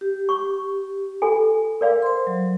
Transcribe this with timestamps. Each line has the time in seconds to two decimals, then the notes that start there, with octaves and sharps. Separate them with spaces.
0.01 G4
0.29 C#6
1.22 F4 A4 G#5
1.81 A#4 D5 F5
2.02 C5 C6
2.27 F#3